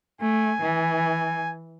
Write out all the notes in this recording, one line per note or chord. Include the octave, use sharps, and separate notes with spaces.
A3 G#5
E3